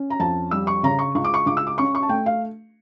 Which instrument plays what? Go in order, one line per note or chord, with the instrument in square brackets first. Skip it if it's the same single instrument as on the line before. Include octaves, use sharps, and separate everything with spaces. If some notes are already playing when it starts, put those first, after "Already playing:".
Already playing: [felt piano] C#4
A#5
F2 A5
G3 E6
C#6
C#3 A#5
C#6
C#2 C#6
D6
C#6
C#2 D6
E6
D6
C#4 C#6
C#6
A5
A3 G5
F5